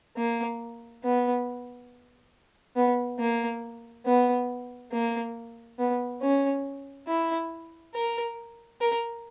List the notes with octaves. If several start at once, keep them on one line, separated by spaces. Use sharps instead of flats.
A#3
B3
B3
A#3
B3
A#3
B3
C#4
E4
A#4
A#4